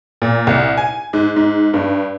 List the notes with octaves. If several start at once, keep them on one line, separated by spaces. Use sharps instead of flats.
A#2
C2
G#5
G#2
G#2
G2